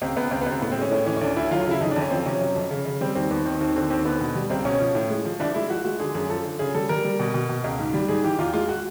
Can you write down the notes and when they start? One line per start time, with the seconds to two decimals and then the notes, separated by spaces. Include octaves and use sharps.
0.02 C#2 C4
0.17 C#2 B3
0.31 C#2 C4
0.41 B3
0.46 C#2
0.51 C4
0.61 A2 B3
0.72 C4
0.77 G#3 C#4
0.91 A2 C#4
1.06 E3 C#4
1.16 C#4
1.21 D2 D4
1.36 D2 E4
1.51 F#3 F4
1.61 F4
1.66 C#3 E4
1.81 F2 D#4
1.91 D4
1.96 F2
2.02 C#4
2.10 F3 C4
2.26 C3 C#4
2.41 F#3
2.56 F2
2.71 C#3
2.85 C#3
3.01 G3 C4
3.15 D#2 C4
3.30 D#2 B3
3.45 D#3 C4
3.61 D#2 C4
3.76 D3 C4
3.90 D#2 C4
4.05 D3 B3
4.21 B2
4.35 G3
4.50 C#2 C4
4.65 B2 C#4
4.80 F3
4.95 A2
5.10 G#3
5.25 F3
5.40 C2 D4
5.54 G#3 E4
5.70 F3 F#4
5.85 G#3 F#4
6.00 D3 G#4
6.14 F#2 G#4
6.30 F3 A4
6.44 D3
6.59 C#3 G#4
6.74 G3 A4
6.89 G3 A#4
7.05 G3
7.20 B2
7.34 B2
7.49 B2
7.64 C#2
7.79 G#2
7.94 G3
8.08 G#2 G#4
8.24 E3 G4
8.38 E2 F4
8.54 G#3 F4
8.69 F#4